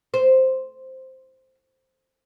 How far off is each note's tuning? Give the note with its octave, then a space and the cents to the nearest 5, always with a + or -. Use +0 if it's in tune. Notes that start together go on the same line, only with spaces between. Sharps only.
C5 +0